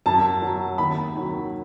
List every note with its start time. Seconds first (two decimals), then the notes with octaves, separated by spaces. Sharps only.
0.06 F#2 A5
0.42 F#3
0.78 D#2 B5
1.15 D#3 F#3